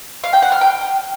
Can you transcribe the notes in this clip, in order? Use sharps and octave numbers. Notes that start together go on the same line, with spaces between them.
F5
G5
F#5
F6
G5